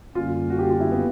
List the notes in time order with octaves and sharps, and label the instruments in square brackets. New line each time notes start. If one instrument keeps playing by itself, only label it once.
[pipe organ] F#2 D3 G3 A#3 C#4 [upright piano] F4
[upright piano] F#4
G4
F4
E4
B3